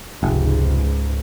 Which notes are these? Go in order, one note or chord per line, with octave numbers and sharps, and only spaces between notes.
F1 C#2 G#2